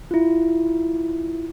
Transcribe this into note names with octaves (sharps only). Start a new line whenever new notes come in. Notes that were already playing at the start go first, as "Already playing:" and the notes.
E4 F4